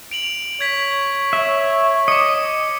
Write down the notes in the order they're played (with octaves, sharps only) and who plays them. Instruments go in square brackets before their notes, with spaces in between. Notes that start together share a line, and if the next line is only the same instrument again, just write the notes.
[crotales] D7 F7 F#7
[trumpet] C#5 [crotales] G#6 B6
[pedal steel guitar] E5
[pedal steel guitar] D#5 [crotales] D6 C#7